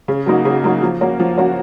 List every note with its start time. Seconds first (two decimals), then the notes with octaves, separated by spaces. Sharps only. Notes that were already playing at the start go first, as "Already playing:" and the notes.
0.08 C#3
0.26 F#3 A#3 D#4 F#4
0.45 C#3
0.64 F#3 A#3 D#4 F#4
0.82 F3
1.01 A#3 C#4 F#4
1.20 F3
1.38 A#3 C#4 F#4